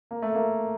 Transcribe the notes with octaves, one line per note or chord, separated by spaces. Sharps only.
A#3
A3
A#3